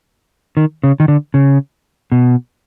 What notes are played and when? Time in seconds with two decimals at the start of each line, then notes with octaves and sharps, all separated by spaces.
0.57 D#3
0.83 C#3
1.00 D#3
1.08 D3
1.34 C#3
2.12 B2